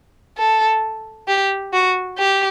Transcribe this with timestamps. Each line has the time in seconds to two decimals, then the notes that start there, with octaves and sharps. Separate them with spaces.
0.38 A4
1.28 G4
1.73 F#4
2.18 G4